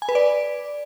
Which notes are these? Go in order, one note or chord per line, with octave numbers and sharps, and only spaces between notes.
G#5
B4
D5